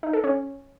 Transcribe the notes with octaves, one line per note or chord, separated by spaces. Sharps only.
D#4
A4
C#4